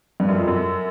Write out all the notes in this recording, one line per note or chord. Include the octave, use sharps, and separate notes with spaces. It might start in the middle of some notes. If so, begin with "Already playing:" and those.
G2
F#2
F2
F#2